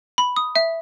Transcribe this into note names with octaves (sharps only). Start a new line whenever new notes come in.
B5
D#6
E5